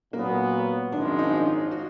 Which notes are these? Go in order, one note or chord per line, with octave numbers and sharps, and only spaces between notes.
A#2 F#3 A#3 B3
G#1 F#2 F3 G#3 D4
D#4
F4
F#4